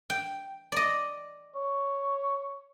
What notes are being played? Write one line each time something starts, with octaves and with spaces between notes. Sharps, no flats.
G5
D5 D#5
C#5